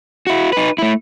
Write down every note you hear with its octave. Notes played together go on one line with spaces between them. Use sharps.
E4 F#4
D#4 B4
A3 E4